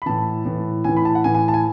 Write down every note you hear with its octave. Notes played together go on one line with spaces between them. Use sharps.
B5
A2 E3 A5
A2 E3
A2 E3 G#5
B5
A5
F#5
A2 E3 G#5
G#5
A5
G#5